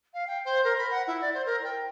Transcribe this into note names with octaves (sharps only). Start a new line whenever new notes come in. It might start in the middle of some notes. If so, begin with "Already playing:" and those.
F5
G5
C5
A#4
B5
F#5
E4
D5
C5
A#4
G5